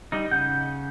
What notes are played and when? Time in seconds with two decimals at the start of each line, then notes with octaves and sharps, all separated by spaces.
0.12 G3 D#4
0.31 C#3 F#5 G6